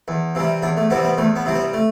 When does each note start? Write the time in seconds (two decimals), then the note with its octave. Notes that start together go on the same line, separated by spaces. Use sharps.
0.08 E2
0.35 C3 E3 G3
0.62 E2 D4
0.77 A3
0.90 C3 E3 G3 B3
1.04 B3
1.17 E2 A3
1.36 B3
1.45 C3 E3 G3
1.55 B3
1.73 A3